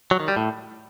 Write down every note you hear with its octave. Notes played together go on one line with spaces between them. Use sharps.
F#3
D#3
G3
A2